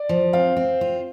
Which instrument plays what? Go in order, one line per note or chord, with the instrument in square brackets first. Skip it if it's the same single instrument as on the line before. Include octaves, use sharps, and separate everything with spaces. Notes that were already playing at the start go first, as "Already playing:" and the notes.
Already playing: [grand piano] D5
[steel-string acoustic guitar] F3
[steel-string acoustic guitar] C4 [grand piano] F5
[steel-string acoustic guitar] C4
F4